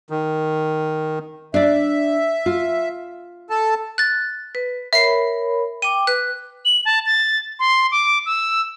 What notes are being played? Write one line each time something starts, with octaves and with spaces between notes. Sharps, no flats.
D#3
D4 D5 E5
F4
A4 A5
F#6 A6
B4
A#4 C#5 E5 B5 C7
G5 D6 D#7
B4 F#6
F#7
A5
A6
C6
D6
E6